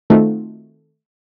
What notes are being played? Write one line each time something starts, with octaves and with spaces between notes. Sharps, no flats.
D#3 A3 C4 D#4 F4 F#4